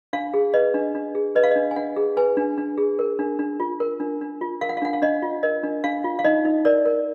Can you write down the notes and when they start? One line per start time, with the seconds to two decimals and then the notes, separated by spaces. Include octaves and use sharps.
0.13 D4 F5
0.34 G#4
0.54 B4 D#5
0.74 D4
0.95 D4
1.15 G#4
1.35 B4 D#5
1.43 F5
1.51 D4 D#5
1.71 G#5
1.76 D4 F#5
1.96 G#4
2.17 B4 G#5
2.37 D4
2.58 D4
2.78 G#4
2.99 A#4
3.19 D4
3.39 D4
3.60 F4
3.80 A#4
4.00 D4
4.21 D4
4.41 F4
4.61 A#4 F5
4.69 F#5
4.77 F5
4.82 D4 F#5
4.93 F5
5.02 D4 D#5
5.23 F4
5.43 A#4 D#5
5.63 D4
5.84 D4 F5
6.04 F4
6.19 F5
6.25 D#4 D#5
6.45 D#4
6.65 A#4 D5
6.85 A#4